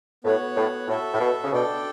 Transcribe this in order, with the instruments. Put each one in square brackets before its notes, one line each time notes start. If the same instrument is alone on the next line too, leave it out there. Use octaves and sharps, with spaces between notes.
[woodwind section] A2 [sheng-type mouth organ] B3 F#4 C#5 F#5
[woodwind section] A2
[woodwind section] A2 [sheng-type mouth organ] F#4 A4 E5
[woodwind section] A2
B2
C#3
[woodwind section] B2 [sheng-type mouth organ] D4 A4 D5 G5